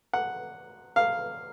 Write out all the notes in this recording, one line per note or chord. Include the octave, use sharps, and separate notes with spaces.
F#5
F5